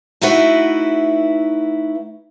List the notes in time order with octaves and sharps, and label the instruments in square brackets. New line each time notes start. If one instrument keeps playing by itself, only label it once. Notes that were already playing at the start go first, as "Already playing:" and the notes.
[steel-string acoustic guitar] A3 D#4 E4 F#4 B4